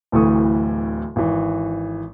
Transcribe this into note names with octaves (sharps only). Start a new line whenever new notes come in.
D1 D2 A2 E3 C#6 D#6
G#1 E3